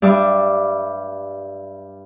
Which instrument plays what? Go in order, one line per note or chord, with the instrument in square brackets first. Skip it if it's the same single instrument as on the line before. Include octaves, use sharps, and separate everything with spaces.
[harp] G2 G3 E5 D6